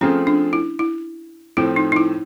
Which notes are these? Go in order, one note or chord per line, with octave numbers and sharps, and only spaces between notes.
F3 A3 C4 C#4 F4 G#4
D4
E4
E4
A2 F3 A3 C4 E4
D#4
D#4
E4